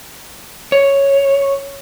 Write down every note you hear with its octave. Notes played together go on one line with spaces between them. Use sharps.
C#5